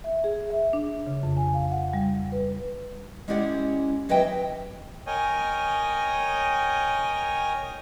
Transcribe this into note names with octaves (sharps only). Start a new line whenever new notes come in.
E5
G#4
E5
D4
C#3
F2
G#5
F5
F#5
G3
B4
G#3 C#4 E4 G4 D5 F#5
D#2 F#3 B4 D#5 E5 G5
A#4 C#5 D#5 G5 G#5